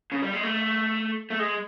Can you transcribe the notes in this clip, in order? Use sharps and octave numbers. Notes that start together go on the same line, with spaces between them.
C#3
G3
G#3
A3
A3
G#3